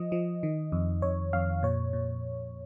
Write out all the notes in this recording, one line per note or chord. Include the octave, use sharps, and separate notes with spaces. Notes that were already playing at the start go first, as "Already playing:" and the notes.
Already playing: F3 D#5
F3
D#3
F2
F2 C#5
F2 F5
A#2 C#5
A#2